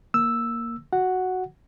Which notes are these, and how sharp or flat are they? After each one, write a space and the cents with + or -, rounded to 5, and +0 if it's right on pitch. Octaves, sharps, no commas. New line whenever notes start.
A#3 +0 E6 +0
F#4 +0 F#5 +0